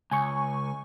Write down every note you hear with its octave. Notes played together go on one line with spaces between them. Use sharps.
C#2 G#5 C#6